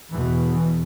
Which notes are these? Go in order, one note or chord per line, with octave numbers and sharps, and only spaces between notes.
E2 B2 E3
E3